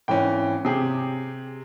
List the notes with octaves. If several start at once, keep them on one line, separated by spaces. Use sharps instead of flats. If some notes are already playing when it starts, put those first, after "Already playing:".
G#1 E3 C#4 G5
C3 G4 G#4 G5